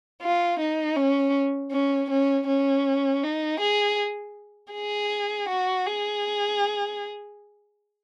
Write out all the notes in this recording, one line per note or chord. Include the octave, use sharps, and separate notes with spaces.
F4
D#4
C#4
C#4
C#4
C#4
D#4
G#4
G#4
F#4
G#4